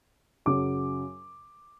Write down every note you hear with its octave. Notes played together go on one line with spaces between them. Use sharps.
F#2 C#3 F#3 D6